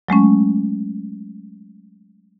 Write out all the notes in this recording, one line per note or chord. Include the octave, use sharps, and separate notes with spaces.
F#3 G#3 A3 C#4